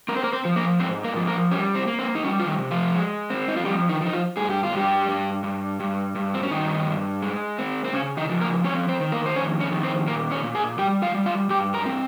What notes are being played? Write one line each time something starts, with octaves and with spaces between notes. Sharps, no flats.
C4 A#4
C5
A#3 A#4
C4 C5
F3
A#3 A#4
G#2 C4 C5
A#3 A#4
F3
A#3 A#4
G3 C#4
C4
A#3
C4
D#4
G3 C#4
F4
D#3 D#4
C3
F3 F4
G#3
C4
D#4
F4
F3 G3 G4
D#3 D#4
F3
D#4
F3 F4
G2 G#4
G4
F4
G2 G3 G4
G2
G2
G2
G2
C4
C#4
G2 D#3 D#4
G2
G#3
C4
C4
C#3 C#4
D#3 D#4
F3
A#3 A#4
C4 C#4 C#5
C4 C5
D#3
A#3 A#4
C5
F2 C#4 C#5
C#4 C#5
D#3
C4 C5
A#2 A#3 A#4
C#4 C#5
A#2
G#4 G#5
G3 G4 G5
F4 F5
G3
F4 F5
G2 G4 G5
A#4 A#5
C4